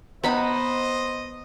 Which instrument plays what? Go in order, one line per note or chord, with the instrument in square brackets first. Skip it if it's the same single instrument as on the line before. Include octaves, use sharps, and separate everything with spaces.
[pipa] C3 D#4 [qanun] B3 B5 [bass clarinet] C5 [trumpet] D#5